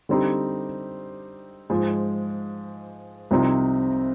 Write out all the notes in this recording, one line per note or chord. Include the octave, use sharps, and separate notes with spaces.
D3 G3 C4 D#4 G4
G#2 F3 G#3
C2 C3 F3 C4 D#4